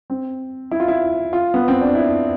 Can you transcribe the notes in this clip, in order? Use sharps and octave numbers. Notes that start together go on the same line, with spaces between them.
C4
E4
F4
E4
F4
B3
C4
D4
E4